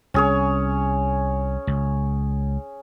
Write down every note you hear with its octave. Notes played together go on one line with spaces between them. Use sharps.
C2 C#4 G#4 C#5
C#2